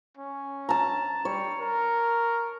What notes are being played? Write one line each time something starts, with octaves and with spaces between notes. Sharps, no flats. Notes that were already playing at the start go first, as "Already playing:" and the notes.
C#4
A5 A#5
G3 C#5
A#4